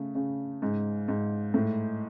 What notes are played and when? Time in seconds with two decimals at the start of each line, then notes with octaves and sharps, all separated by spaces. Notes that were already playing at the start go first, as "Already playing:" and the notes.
Already playing: C#3 A3
0.15 C#3
0.62 G#2
1.08 G#2
1.54 A2